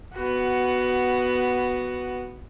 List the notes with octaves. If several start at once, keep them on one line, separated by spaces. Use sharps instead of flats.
B3 F#4